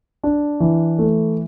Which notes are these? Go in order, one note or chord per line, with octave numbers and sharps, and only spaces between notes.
D4
E3
A3